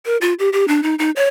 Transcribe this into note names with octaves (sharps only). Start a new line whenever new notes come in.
A#4
F4
G4
G4
D4
D#4
D#4
C#5